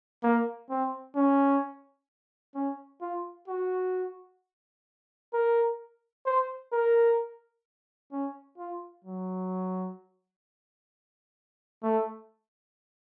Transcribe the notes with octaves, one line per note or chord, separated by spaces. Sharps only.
A#3
C4
C#4
C#4
F4
F#4
A#4
C5
A#4
C#4
F4
F#3
A3